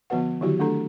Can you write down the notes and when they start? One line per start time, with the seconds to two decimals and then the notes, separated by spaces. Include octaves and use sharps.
0.10 D3 F3 B3 F#4 B4 F#5
0.41 D3 D#3 F#3 E4 F#4 G4
0.60 A3 D4 A4 A#5